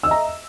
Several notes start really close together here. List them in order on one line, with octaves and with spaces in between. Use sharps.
E6 D#5 E5 A#5